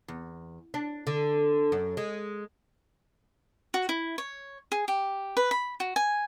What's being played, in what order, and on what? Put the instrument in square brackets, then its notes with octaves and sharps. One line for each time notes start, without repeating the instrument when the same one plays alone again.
[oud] E2
D4
D3
F#2
G#3
[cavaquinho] F#4
E4
C#5
G#4
G4
B4
B5
F#4
G#5